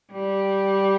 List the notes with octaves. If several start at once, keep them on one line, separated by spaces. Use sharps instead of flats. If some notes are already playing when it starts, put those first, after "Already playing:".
G3